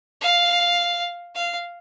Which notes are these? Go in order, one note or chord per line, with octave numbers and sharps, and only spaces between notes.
F5
F5